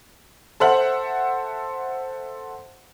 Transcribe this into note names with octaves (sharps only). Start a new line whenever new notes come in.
A4 C5 E5 F#5 F#7